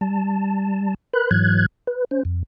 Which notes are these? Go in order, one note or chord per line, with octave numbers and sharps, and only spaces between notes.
G3 A5
A#4 B4 B5 F#6
G#2 E3 F#3 F#6 G#6
B4
C#4 C5
F2